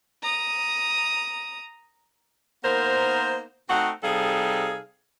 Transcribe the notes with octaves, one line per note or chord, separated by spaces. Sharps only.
A#5 D#6
A#3 B3 D#4 A#4 C5
A3 C4 D#4 F#4 F#5
C3 G3 D#4 G#4 A4 F5